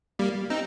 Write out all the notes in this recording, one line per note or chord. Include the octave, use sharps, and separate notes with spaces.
G3 A#3
C4 D#4